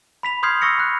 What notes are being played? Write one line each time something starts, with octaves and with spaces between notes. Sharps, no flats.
B5 B6 F7
C6 D#6 F6 G6 G#6 C7
C#6 E6 A#6 C#7
B5 F#6